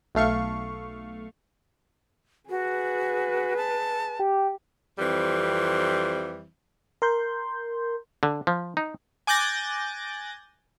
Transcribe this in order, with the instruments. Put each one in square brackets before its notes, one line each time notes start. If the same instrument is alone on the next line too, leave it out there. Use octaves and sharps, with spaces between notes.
[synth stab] B1 A3 F5 C#6
[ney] F#4 [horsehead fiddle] G#4 B4
[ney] A5
[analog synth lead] G4
[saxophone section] F2 E3 G3 C4
[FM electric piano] A#4 C6 G6
[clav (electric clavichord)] D3
F3
D#4
[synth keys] G#5 D6 F#6 G6 A6 A#6